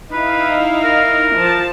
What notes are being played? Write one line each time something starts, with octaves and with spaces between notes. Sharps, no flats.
D#4 E4 B4 F5
A#4
F3 A5